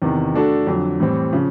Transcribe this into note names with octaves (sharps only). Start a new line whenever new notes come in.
E2 C3 D#3
A3 D4 F#4 A4
F2 D3 F#3
A2 E3 G3 C4
C#3 F3